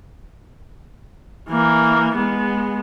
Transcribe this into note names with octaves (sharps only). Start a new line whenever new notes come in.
E3 A#3
G#3 B3